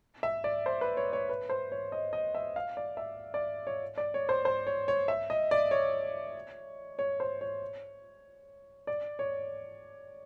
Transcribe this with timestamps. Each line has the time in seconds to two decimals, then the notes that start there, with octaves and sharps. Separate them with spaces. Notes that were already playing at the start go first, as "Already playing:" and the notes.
0.23 E5
0.44 D5
0.66 C5
0.81 B4
0.97 C#5
1.13 C#5
1.29 B4
1.50 C5
1.72 C#5
1.92 D#5
2.13 D#5
2.35 E5
2.56 F5
2.77 D5
2.97 E5
3.34 D5
3.67 C#5
3.98 D5
4.14 C#5
4.29 C5
4.45 C5
4.67 C#5
4.88 C#5
5.08 E5
5.30 D#5
5.51 D5
5.71 C#5
6.99 C#5
7.20 C5
7.41 C#5
8.87 D5
9.19 C#5